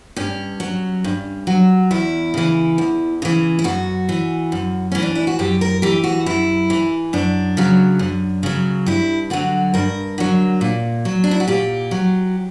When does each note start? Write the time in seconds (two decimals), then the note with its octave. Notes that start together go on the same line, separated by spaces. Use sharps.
0.16 G2 C#4
0.60 F#3
1.04 G2
1.47 F#3
1.91 E2 E4
2.34 C#3 E3
2.78 E2
3.22 C#3 E3
3.59 E4
3.64 F#2 F#4
4.09 E3
4.52 F#2
4.92 E3 C#4
5.03 D4
5.15 E4
5.27 F#4
5.39 F#2 G4
5.61 A#4
5.82 E3 G4
6.04 F#4
6.26 F#2 E4
6.70 E3
7.13 F#2 D4
7.57 C#3 F#3
7.99 F#2
8.43 C#3 F#3
8.86 G2 E4
9.30 D3 F#3 F#4
9.74 G2 A#4
10.18 D3 F#3
10.61 A#2
11.05 F#3
11.24 D4
11.31 E4
11.40 F#4
11.48 A#2 G4
11.91 F#3